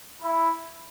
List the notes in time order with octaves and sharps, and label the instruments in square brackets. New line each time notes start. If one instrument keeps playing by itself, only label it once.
[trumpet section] E4